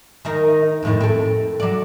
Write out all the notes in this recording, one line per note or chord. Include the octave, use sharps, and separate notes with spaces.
D#3 D#4 A#4
F2 A2 D#3
C4 A4
F#3 D5